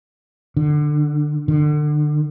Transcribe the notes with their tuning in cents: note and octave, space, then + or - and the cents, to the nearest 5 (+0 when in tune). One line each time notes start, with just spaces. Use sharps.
D3 +20
D3 +30